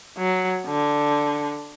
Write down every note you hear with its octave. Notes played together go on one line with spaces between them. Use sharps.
F#3
D3